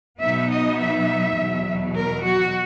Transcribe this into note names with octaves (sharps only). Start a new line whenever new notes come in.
B2 F#3 B3 D#4 E5
D#5
E5
E2 B2 F#3
A#4
F#4